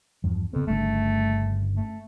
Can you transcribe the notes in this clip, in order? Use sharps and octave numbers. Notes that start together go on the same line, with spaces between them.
E2 G2 F3
F2 C#3 B3
G1 G2 C#3 A3
A3